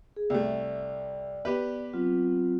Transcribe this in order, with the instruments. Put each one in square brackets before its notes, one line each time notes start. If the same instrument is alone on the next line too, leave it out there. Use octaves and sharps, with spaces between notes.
[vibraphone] G#4
[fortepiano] C2 A3 [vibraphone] D5
[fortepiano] B3 G4 B4
[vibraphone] F#3 C4 F4